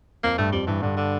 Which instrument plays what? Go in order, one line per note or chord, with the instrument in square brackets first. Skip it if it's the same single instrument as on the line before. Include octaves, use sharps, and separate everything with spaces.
[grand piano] F2 [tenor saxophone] A#3
[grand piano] G2 [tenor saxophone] A3
[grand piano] F2 [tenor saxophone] G3
[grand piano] G2 [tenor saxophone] E3
[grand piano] G2 [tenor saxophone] D3
[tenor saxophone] D3